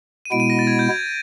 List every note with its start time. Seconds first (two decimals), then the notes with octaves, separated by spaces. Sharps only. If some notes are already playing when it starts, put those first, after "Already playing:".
0.25 D#7
0.32 B2 G#3 B3 E4 D7
0.40 D#7
0.50 A#6
0.59 A6
0.67 G#6
0.79 G6
0.90 G#6